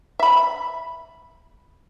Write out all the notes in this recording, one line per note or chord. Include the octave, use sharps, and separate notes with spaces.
E5 B5